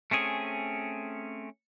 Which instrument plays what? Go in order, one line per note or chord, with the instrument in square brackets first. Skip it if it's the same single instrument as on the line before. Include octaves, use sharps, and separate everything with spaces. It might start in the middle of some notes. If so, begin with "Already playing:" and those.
[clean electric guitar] A3 C4 C#4 G#4